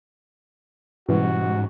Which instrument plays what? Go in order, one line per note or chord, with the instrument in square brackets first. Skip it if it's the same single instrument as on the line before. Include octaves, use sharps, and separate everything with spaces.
[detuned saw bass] G#2 [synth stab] B2 E3 [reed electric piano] G3 C#4 [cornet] F#4